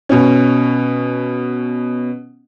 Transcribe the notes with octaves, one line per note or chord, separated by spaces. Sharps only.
B2 C#4